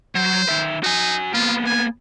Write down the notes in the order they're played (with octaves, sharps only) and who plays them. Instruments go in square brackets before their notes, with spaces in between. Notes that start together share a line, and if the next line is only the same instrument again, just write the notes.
[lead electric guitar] F#3 [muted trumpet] C5
[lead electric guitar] D#3 E5
[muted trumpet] D#4 [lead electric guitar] F#4 G#5
[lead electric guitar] A#3 B3 [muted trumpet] F4
[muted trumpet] G#5